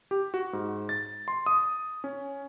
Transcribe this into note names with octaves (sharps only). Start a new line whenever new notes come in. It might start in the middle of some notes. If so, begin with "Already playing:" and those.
G4
F#4
G#2
A6
C6
D#6
C#4